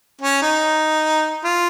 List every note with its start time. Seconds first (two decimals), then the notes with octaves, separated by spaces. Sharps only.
0.21 C#4
0.42 D#4
1.44 F4